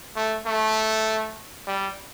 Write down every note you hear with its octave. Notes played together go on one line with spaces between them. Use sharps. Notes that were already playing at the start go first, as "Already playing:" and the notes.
A3
A3
G3